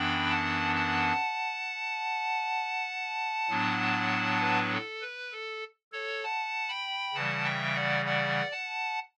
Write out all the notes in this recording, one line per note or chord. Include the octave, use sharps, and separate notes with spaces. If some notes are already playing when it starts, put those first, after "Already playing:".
Already playing: F#2 E3 B3 D4 G5 B5
F#5 A5
F#5 A5
A2 F#3 B3 D4
B4
A4
B4
A4
A4 C#5
F#5 A5
G5 B5
C#3 E3 G3 F#5 A5
E5 G5
D5 F#5
D5 F#5
F#5 A5